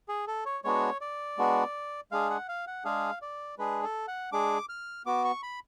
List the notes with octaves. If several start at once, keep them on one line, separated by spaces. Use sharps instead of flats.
G#4
A4
C#5
G#3 B3 D4 F#4 C#5
D5
G#3 B3 D4 F#4
G#3 D4 G#4 F5
F#5
F5
F#5
G#3 D4 G#4 F5
D5
G#3 D4 G#4 B4
A4
F#5
G#3 D4 G#4 D6
F6
B3 F#4 D6
C#6
B5